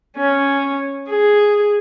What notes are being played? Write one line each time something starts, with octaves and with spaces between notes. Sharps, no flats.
C#4
G#4